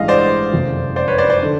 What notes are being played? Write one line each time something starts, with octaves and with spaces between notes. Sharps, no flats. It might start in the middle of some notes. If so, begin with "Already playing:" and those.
Already playing: A1 G2 E3 G#3 D#5 F5
C5 D5
F#1 F2 C3 F3
C5 D5
B4 C#5
C5 D5
C5 D5
D3